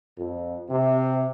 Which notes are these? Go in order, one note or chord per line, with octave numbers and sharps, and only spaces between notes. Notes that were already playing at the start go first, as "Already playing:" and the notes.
F2
C3